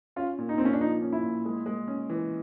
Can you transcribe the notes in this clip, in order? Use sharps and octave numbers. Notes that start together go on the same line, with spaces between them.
C#4 F4
A#2
D#4
A#2 C4
C#4
D4
F3 D#4
C#4
E4
A#2
G#3
G#3
C#4
E3